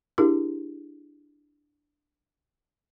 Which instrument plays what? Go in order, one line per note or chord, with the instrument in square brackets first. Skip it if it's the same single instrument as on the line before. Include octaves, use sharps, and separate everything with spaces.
[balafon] D4 E4 G4 G#4 A#4